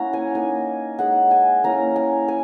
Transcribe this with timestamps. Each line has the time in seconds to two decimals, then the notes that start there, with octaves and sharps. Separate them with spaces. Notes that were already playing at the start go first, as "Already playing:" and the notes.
Already playing: A#3 C#4 E4 C#5 F#5 A#5
0.13 G#5
0.34 A#3 D#4 G#5
0.99 G#3 D#4 F#5
1.31 G#5
1.64 A#3 C#4 E4 A#5
1.96 G#5
2.28 E4 G#5